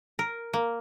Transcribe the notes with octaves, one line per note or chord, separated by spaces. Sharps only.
A#4
A#3